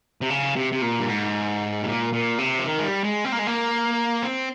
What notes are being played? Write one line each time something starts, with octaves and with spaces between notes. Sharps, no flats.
C3
C#3
C3
C3
A#2
G2
G#2
C3
A#2
A#2
C3
F3
D#3
G#3
G3
G#3
C4
A#3
G#3
A#3
C4